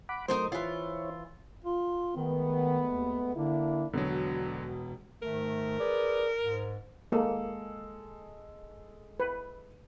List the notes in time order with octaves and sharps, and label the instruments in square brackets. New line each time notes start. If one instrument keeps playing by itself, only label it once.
[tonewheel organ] F#5 B5 D6
[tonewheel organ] F#3 A3 [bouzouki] D#4 A#4 C5
[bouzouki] E3 F4 [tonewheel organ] E4 C5 C#5
[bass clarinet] F4
[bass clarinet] D#3 [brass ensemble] G#3 A3 B3
[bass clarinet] D#2
[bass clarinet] D3 [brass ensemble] A#3 D4 E4
[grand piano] E1 B2 [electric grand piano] D3 F#3
[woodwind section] G#2 D#3 A3 [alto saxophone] A#4
[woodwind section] G#4 B4 D5
G#2
[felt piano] G#3 A4 [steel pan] A#3
[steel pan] B4